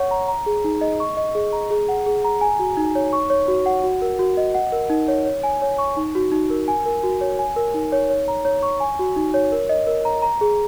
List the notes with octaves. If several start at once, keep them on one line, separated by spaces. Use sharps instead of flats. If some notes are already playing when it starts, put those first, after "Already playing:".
Already playing: C#5 F#5 C#6
A#5
A#5
G#4
D#4
D#5
C#6
D#5
G#4
A#5
G#4
F#5
G#4
A#5
G#5
F#4
D#4
C#5
C#6
C#5
F#4
F#5
F#4
A#4
F#4
D#5
F#5
A#4
D#4
C#5
C#5
G#5
C#5
C#6
D#4
F#4
D#4
A#4
G#5
A#4
F#4
C#5
G#5
A#4
D#4
C#5
C#5
A#5
C#5
C#6
G#5
F#4
D#4
C#5
A#4
D#5
A#4
A#5
A#5
G#4